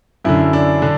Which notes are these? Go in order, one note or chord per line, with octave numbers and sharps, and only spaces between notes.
F#2 D3 E4
D4
D3 D4